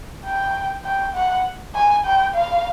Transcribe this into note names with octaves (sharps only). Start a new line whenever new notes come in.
G5
G5
F#5
G#5
G5
F5